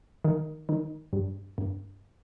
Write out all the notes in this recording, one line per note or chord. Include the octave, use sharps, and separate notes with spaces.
D#3
D#3
G2
G2